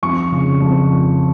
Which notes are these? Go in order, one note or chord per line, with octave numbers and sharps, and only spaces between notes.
F2 C#6
C#3
F2